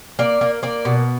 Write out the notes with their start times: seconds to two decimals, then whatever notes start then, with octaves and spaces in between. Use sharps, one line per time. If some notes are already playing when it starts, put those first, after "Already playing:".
0.19 A#3 D5
0.41 A#3
0.63 A#3 D5
0.85 B2